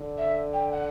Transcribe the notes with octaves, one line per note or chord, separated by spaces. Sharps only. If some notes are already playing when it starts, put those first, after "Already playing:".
Already playing: D3
E5
G5
F#5